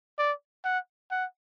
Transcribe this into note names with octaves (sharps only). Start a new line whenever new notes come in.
D5
F#5
F#5